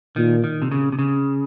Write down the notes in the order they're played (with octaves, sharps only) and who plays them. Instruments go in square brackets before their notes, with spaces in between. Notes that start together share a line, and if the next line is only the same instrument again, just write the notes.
[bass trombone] A#2 [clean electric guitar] D#3
[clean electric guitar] D#3
C3
C#3
C3
C#3